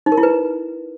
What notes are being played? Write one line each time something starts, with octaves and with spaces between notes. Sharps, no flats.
D#4
A#4
E4
B4